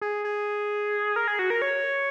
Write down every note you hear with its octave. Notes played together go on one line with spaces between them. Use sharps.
G#4
G#4
A#4
G#4
F#4
A#4
C#5